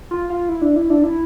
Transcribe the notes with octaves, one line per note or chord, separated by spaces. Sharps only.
F4
F4
E4
D4
E4
D4
E4